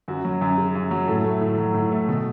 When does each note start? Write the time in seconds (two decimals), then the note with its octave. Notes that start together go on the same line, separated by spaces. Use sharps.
0.08 F#2 F#4
0.25 F#3
0.41 F#2
0.58 C#3
0.75 F#2
0.91 F#3
1.07 A2 A4
1.24 A3
1.41 A2
1.58 F#3
1.74 A2
1.91 A3
2.08 B2 A4